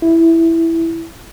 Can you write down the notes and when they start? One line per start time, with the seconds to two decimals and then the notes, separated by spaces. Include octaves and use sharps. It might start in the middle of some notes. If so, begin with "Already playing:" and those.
0.02 E4